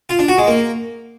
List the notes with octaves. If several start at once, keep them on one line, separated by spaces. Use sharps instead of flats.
F4
D4
F#4
G#3
A#3